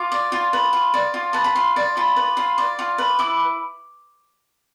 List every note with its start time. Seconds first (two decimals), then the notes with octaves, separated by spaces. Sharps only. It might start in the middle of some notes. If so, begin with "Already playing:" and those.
Already playing: F4 D6
0.12 D5
0.32 F4
0.53 B4
0.73 F4
0.94 D5
1.14 F4
1.33 B4 A5
1.44 B5
1.55 F4 C6
1.76 D5
1.97 F4 B5
2.16 B4
2.37 F4 C6
2.58 D5
2.79 F4
2.98 B4
3.19 E4 D6